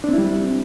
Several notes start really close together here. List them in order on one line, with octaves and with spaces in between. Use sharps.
D4 C4 E4 G3